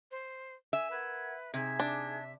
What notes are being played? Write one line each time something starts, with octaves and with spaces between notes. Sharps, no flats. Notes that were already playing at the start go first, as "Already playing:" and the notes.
C5
E5 G#5
A#4 B4 F#5 G#6
C3 D#4 G#4 E5 G#6
D4